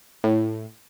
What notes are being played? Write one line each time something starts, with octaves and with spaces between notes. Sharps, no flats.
A2